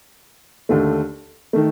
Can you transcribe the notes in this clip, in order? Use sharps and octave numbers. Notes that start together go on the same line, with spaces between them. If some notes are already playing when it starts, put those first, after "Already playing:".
D#2 D3 A3
D#3 A3